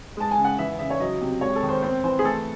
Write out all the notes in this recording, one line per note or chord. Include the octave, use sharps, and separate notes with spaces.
G#3 A5
G#5
C#3
F#5
E3 E5
C#3 E5
C#5
F#3 D#5
C3
G#3 C#5
A4
D#3
C5
C4 C5
E3 C5
G#4
A3 A4